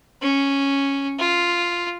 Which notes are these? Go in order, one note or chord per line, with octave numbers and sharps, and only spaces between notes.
C#4
F4